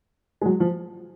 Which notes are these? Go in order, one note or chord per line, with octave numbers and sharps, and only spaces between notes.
G#3
F#3
F3